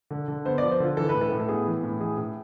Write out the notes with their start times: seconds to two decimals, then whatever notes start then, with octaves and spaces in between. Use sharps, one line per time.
0.11 D3
0.28 D3
0.45 B3 C5
0.58 D5
0.62 F3
0.71 C5
0.80 D3 F4
0.97 E3 A4
1.09 B4
1.15 A2
1.21 A4
1.32 A2
1.40 A4
1.49 B3 G#4
1.66 E3
1.83 A2
2.01 E3 G#4
2.18 A2